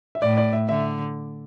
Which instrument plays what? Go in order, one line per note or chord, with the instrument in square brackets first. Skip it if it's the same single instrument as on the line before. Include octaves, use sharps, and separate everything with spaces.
[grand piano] E5
[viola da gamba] A2 [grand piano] D5
[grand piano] D5
E5
[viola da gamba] D3 [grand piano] E5